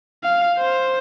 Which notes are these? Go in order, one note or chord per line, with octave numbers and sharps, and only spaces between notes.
F5
C5